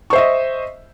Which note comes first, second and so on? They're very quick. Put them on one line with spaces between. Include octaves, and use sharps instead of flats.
C#6 C5 E5 D#5